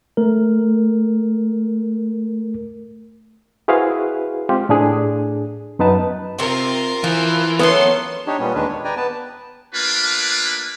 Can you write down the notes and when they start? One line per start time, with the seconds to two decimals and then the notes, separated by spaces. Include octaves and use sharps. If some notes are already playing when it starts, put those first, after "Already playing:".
0.17 A3 A#4
3.68 E4 F#4 G#4 B4 C5 F5
4.49 G#3 C4 F4 G4
4.69 A2 D4 G#4 G#5
5.79 F#2 B3 D#4 B4 A5
6.39 C3 C4 F4 A#4
7.04 E3 F3
7.59 F#3 A3 B3 C#4 A4 C6
8.27 D4 D#4 G4 C#5
8.40 A#2 G3 B3 C#4
8.55 D#2 D#3 G#3 D4 B4
8.69 C#5
8.84 B4 D5 G5 G#5 A#5
8.97 B3 B4 A5
9.75 A3 A#3 D4 F4 B4